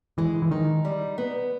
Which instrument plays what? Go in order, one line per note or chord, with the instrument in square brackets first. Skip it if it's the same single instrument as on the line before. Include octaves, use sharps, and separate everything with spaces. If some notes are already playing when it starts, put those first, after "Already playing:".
[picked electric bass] E3 [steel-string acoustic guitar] G#3
[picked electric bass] E3
[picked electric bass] D#3 [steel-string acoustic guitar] D#4
[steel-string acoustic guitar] G3
B3